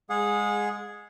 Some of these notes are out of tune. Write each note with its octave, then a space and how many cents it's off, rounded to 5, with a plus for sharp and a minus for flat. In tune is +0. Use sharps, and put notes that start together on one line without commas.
G#3 -15 G#4 +0 F#5 -40